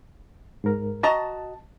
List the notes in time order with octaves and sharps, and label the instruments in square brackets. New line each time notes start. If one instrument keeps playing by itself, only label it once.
[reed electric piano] G#2 A#4
[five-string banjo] F#4 D#5 A#5 [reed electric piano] A5